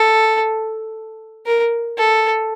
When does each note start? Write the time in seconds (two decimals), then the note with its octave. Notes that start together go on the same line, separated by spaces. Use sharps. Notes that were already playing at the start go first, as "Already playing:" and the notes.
Already playing: A4
1.46 A#4
1.98 A4